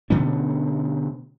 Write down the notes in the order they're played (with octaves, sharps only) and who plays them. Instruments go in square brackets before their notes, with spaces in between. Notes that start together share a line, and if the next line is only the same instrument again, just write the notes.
[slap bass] B2 D3 A3 C#4